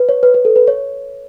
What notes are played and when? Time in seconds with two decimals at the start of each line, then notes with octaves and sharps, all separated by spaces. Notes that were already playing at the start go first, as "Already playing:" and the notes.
Already playing: B4
0.09 C#5
0.23 B4
0.34 B4
0.45 A4
0.56 B4
0.67 C#5